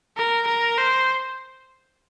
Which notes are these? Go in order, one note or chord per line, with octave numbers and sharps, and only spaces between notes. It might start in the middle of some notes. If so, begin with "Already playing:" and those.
A#4
A#4
C5